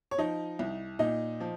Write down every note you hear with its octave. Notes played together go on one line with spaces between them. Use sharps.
C#5
F3 D#4 D#5
C2
A#2 D#4 D#5
F3